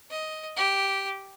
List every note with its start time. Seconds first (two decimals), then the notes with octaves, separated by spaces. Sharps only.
0.11 D#5
0.57 G4